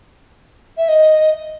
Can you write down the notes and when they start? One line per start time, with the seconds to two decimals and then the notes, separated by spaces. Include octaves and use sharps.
0.78 E5
0.89 D#5